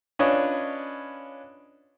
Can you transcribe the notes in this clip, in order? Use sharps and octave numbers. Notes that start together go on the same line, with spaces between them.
C#4 D4 F4 B4 C#5 D#5